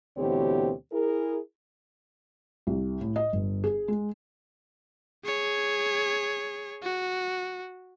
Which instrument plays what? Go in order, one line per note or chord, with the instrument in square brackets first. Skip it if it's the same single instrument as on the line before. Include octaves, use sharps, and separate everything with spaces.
[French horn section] D2 B2 E3 C4 G4 C#5
E4 G#4 A#4
[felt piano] C2
A2
D#5
G1
G#4
G#3
[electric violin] G#4 C#5
F#4